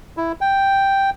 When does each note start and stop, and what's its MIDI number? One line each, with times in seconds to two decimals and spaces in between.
0.17 0.32 64
0.41 1.10 79